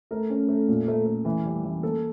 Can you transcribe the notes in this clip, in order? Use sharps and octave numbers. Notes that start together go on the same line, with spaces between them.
A3 A#4
C#4
A3
A#2
A3
A3
E3
G3
E3
A#3 A4